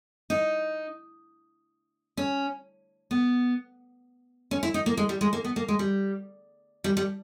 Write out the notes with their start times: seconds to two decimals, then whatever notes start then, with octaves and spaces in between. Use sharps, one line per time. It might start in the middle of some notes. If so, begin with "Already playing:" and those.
0.30 D#4
2.17 C#4
3.11 B3
4.51 C#4
4.63 E4
4.74 D#4
4.86 A#3
4.97 G#3
5.09 G3
5.21 G#3
5.33 A#3
5.44 B3
5.56 A#3
5.68 G#3
5.79 G3
6.84 G3
6.97 G3